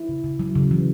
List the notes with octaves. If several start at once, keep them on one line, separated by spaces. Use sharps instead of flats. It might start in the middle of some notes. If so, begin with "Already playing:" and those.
Already playing: E4
C#3
C#3
F#3
C#3
E3